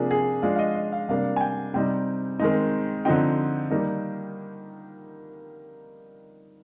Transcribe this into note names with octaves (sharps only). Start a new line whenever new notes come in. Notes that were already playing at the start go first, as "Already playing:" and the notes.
Already playing: C3 F3 A#3 D4 G#4
G#4
F3 G#3 D4 F5
F5
D#5
D#5
F5
C3 G3 A#3 D4 F5
G#5
G5
C3 G3 C4 D#4 G5
D#3 G#3 C4 D#4
D3 F3 C4 D#4 G5
D#3 G3 A#3 D#4